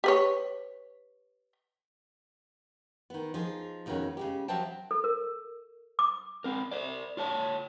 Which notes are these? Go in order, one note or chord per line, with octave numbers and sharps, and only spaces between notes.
G4 B4 C#5
D#3 B3
F3 D#4 G#4
F2 B2 D#3 G#3 C#4
C#3 G#3 G4
F3 F#3 C5 E5 G5 A5
A4
A#4
D6
C4 A#4
C5 D5
F4 C#5 A5